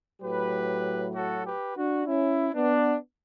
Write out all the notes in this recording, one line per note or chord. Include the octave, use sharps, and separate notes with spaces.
A2 F#3 G4 B4
F#4 A4
G4 B4
D4 F#4
C#4 E4
B3 D4